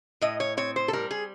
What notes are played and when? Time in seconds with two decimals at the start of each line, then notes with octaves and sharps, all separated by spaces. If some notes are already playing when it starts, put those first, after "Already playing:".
0.21 A2 D#5
0.40 C#5
0.57 C4 C#5
0.76 C5
0.88 A4
0.93 G3 A#4
1.11 G#4